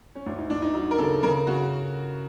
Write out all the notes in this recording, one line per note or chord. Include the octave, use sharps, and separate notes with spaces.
C#4
D2 D4
D#4
D2 D4
D#4
F#3 D#4
A#4
C#3 A4
C#3 A#4
C#3 F#4